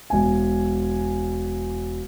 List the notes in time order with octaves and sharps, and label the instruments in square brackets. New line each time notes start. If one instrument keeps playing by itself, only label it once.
[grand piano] E1 G#5